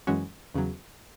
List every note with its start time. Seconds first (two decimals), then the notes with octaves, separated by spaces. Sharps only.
0.07 F#2 E3 G#3 C#4 F#4
0.54 E2 C#3 F#3